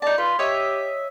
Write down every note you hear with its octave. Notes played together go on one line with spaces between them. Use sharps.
D#4 D5 A5
F4 B4
G4 C#5 D#5 E5